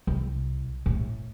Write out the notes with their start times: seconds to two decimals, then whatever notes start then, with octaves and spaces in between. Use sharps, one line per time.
0.07 C2
0.86 A2